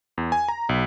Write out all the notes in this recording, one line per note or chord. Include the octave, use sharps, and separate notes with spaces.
E2
G#5
A#5
B1